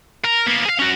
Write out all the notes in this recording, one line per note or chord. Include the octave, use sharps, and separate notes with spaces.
A#4
A#3 B3
G#4 F5
C#4 F#4